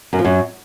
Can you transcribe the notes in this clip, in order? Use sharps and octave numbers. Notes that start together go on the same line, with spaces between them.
F#2
F3
F#2